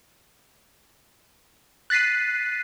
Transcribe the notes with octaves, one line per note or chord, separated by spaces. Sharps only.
F#6 A6 B6 C7 D#7